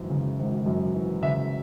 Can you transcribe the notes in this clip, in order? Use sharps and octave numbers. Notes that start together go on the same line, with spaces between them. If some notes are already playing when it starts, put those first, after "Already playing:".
Already playing: G#1 F#2 E3
C#3
G#1
F#2
E3
C#3 E5